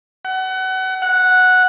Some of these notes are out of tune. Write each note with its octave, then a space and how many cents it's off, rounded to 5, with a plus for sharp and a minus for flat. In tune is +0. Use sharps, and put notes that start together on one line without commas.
F#5 +30
F#5 -5